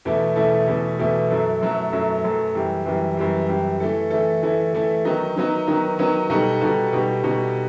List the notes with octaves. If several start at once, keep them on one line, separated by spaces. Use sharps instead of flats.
E2 B2 A3 E4 A4
E2 B2 A3 E4 A4
E2 B2 A3 E4 A4
E2 B2 A3 E4 A4
F#2 F#3 A3 E4 A4
F#2 F#3 A3 E4 A4
F#2 F#3 A3 E4 A4
F#2 F#3 A3 E4 A4
F#2 E3 G3
F#2 E3 G3
F#2 E3 G3
F#2 E3 G3
E3 A3 E4 A4
E3 A3 E4 A4
E3 A3 E4 A4
E3 A3 E4 A4
D#3 F#3 B3 D#4
D#3 F#3 B3 D#4
D#3 F#3 B3 D#4
D#3 F#3 B3 D#4
B2 G3 D#4 F#4 A4
B2 G3 D#4 F#4 A4
B2 G3 D#4 F#4 A4
B2 G3 D#4 F#4 A4